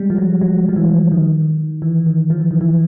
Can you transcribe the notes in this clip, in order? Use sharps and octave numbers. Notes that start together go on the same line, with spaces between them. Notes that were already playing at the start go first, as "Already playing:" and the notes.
Already playing: G3 G#3
F3
F#3
F#3
F3
E3
D#3
E3
D#3
F3
E3
D#3
E3